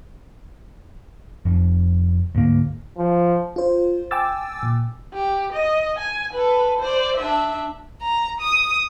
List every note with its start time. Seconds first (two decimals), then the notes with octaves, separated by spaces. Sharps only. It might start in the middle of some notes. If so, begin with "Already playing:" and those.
1.45 F1 F2
2.35 D2 G#2 A#3
2.98 F3
3.56 F4 C5
4.11 G5 G#5 D6 E6 A6
4.63 A#2
5.13 G4
5.53 D#5
5.99 G#5
6.33 A4 B4
6.79 C5 D5
7.16 D4 E5
8.02 A#5
8.41 D#6